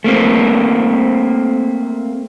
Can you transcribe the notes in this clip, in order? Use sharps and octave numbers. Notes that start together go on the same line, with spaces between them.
A3 A#3 C4